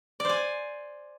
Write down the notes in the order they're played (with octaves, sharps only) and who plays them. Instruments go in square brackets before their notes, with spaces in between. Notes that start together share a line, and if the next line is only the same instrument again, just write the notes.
[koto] D5
C5
G#5